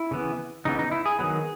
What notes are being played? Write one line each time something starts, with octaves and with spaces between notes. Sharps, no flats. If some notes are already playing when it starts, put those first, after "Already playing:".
Already playing: E4
C#3 E3 B3
C#3 E3 B3 D#4
D#4
E4
G#4
D#3 F#3 B3